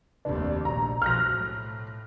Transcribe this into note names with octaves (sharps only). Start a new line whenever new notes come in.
F1 D#2 D4
A#1 A#5
B1 F3 F6 F#6 A#6
A2